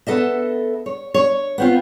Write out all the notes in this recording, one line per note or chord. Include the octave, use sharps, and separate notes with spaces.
B3 A4 D#5 E5
C#5
C#5
B3 C4 F4